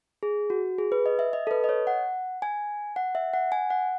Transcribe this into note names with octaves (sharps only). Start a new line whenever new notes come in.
G#4
F#4
G#4
B4
D#5
E5
D#5
A4
B4
D#5
C#5
F#5
G#5
F#5
E5
F#5
G#5
F#5